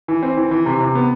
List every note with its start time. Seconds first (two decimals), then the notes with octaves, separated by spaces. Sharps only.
0.08 E3
0.23 C4
0.37 E3
0.51 E3
0.66 C3
0.80 C3
0.95 B3